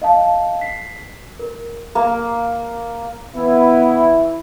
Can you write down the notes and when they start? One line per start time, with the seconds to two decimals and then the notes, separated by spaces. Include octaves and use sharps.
0.02 D#5 F5 A5
0.61 B6 C7
1.39 A#4
1.95 A#3
3.35 E3 B3 E4